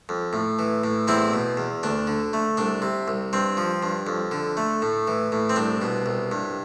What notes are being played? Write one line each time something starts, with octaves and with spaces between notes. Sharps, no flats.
F2
A2
E3
A2
E2 C4 E4
B2
E2
D2 D4
D3
A3
C2 D4
C3
C2
G2 C4
F3
G2
F2
D3
A3
A2
E3
A2
C4
C2 D4
B2
C2
G2